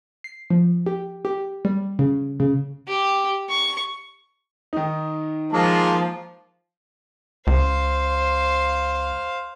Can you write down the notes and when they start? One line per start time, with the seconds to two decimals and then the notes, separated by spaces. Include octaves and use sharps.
0.24 C7
0.50 F3
0.86 G4
1.25 G4
1.65 G3
1.99 C#3
2.40 C#3
2.87 G4
3.49 C#6
4.73 D#3 D#4
5.53 F3 G#3 A#3 F4 A5
7.47 C#2 C5 F5